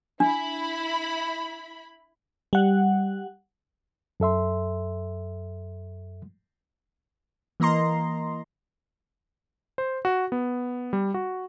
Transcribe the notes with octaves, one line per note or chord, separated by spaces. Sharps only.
D4 E4 B5
G3 F#5
F#2 A4 E5 C6
E3 A#3 D#5 A#5 C6
C5
F#4
B3
G3
F#4